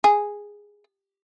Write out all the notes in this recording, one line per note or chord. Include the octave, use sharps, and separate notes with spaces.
G#4